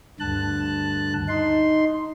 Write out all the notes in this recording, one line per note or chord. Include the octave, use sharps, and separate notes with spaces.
D2 G2 D3 A5 F#6
D#4 C6